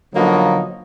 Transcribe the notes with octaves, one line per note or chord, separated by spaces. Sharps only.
D3 F3 F#3 A#3 B3 D#4